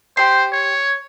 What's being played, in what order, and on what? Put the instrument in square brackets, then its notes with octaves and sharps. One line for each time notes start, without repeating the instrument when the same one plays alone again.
[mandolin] G4 C6 [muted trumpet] C5
[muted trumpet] C#5